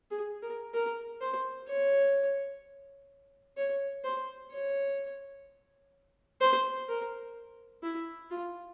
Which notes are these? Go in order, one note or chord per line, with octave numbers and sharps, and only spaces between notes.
G#4
A#4
A#4
C5
C#5
C#5
C5
C#5
C5
A#4
E4
F4